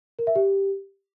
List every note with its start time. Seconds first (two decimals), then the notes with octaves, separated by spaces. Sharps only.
0.19 A#4
0.27 E5
0.36 G4